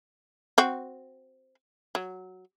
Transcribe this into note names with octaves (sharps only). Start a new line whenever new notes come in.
C4 F#4
F#3